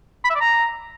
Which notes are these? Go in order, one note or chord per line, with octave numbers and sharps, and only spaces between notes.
B5
E5
D5
A#5